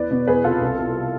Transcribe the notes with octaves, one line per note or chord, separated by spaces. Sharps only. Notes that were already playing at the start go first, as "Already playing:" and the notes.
Already playing: E2 B4 D5
B2
E2 G#4 B4
C3 F4 A4
C2
B2